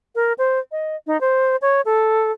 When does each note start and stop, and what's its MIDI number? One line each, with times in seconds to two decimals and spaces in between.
0.15 0.33 70
0.38 0.59 72
0.72 0.96 75
1.07 1.20 63
1.21 1.56 72
1.62 1.81 73
1.85 2.32 69